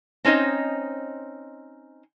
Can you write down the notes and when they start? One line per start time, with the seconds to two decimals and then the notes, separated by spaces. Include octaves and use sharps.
0.25 C4 C#4 D#4 C5 D#5